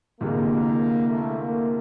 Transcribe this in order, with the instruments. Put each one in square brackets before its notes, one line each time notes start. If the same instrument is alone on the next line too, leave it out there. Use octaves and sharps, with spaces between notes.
[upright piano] D2 C3 E3 G#3 [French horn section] A#3
[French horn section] A3
A#3